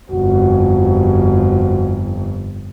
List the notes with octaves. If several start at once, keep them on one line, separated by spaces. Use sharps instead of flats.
G1 F2 F#4